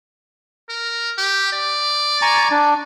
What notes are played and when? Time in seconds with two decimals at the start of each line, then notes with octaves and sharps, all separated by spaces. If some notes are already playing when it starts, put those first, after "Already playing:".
0.69 A#4
1.18 G4
1.52 D5
2.22 G#5 A#5 C#6
2.51 D4